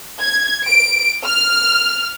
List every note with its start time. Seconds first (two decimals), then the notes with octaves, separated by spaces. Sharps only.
0.20 G#6
0.67 D7
1.25 F6